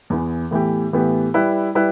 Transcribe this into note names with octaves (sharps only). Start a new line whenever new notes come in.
E2 E3 B3
A2 E3 B3 G4
A2 E3 B3 G4
G3 E4 B4
G3 E4 B4